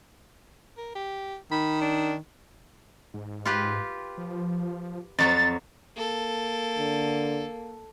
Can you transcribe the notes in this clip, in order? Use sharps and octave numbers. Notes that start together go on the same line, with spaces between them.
A#4
G4
D#3 B5
D4
G#2
F4 G4 B4
F3
F2 F#3 C4 A#5 A6
A#3 A4
D3